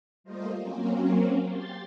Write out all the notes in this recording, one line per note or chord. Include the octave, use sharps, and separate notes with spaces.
G3 A3 A#3 F4 C5 D#5
F#3 A#3 C4 C#4
G4 C6 A6